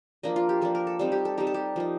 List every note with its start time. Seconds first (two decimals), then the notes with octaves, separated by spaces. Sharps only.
0.23 F3 A#3 D4 D#5
0.36 F4
0.49 G4
0.61 F3 A#3 D4 A4
0.75 A#4
0.87 A4
0.99 G3 C4 D#4 A4
1.12 G4
1.25 A4
1.37 G3 C4 D#4 G4
1.47 A4
1.54 G4
1.76 F3 A#3 D#4